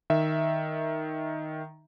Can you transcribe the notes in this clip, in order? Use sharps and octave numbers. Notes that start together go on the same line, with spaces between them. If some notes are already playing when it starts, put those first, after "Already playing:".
D#3 E5